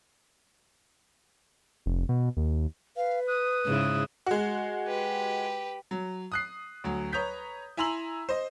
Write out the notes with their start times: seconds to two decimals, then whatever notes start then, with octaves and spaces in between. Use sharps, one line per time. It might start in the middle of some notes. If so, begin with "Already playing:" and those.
1.86 F1
2.09 B2
2.37 D#2
2.97 B4 F5
3.27 D#6 F#6
3.66 G#2 C#3 E4
4.26 G#3 F#4
4.87 G4 B4
5.91 F#3
6.32 D#6 F#6 C7
6.84 D2 F#3
7.12 B4 C#5 A#5 D#6 G6 B6
7.77 E4 G#5 A#5 C6 E6 F#7
8.29 C5 D#5